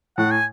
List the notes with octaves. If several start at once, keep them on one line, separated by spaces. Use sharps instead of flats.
A2 F#5
G#5